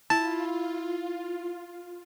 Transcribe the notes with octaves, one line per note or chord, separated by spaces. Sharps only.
E4 F4 A5